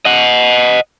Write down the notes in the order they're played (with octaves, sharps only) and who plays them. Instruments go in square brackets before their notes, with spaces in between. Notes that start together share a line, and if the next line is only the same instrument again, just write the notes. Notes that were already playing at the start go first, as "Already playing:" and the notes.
[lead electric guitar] D#5 F#5